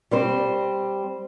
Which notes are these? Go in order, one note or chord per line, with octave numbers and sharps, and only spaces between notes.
G3 C4 C5